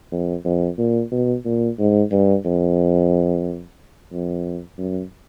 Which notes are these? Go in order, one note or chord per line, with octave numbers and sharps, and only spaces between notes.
F2
F2
A#2
B2
A#2
G#2
G2
F2
F2
F#2